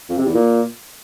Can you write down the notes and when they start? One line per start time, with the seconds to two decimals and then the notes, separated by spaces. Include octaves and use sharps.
0.09 F2
0.18 C3
0.26 E2
0.34 A#2